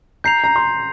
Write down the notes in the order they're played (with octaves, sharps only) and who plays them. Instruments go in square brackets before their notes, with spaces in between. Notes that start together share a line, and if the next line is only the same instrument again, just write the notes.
[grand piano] A#5 [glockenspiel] G6 C7 F7
[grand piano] A#5
C6